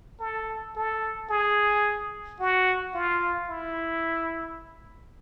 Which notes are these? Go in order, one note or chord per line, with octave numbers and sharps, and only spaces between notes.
A4
A4
G#4
F#4
F4
E4